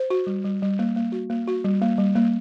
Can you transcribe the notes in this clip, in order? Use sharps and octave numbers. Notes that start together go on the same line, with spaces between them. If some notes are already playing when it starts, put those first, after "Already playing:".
Already playing: C5
F#4
G3
G3
G3
A#3
A#3
F#4
A#3
F#4
G3
A#3
G3
A#3